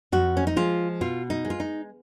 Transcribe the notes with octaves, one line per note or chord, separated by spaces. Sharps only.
F2 F#4
C#4
D#4
F3 G#3 F4
B2 F4
D#4
G#3
F4
D#4